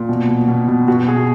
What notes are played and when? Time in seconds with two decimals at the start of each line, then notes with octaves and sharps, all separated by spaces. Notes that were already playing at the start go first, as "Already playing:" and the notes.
Already playing: A#2
0.09 B2
0.28 B2
0.48 B2
0.68 B2
0.88 B2 F#4
1.08 B2 G#4